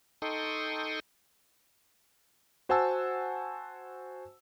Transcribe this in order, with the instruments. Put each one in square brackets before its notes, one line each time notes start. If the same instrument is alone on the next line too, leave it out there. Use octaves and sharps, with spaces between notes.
[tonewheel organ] D#4 A4 G5 C6 C#6 D#6
[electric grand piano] F#4 C5 F#5 G#5 A5 E6